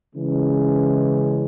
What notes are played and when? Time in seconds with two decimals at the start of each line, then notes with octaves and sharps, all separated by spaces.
0.15 C#3 E3 G#3